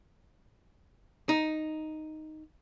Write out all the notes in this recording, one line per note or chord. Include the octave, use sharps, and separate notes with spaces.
D#4